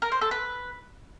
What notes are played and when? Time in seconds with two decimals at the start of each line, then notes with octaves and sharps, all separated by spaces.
0.02 A#4
0.12 C5
0.21 A4
0.31 B4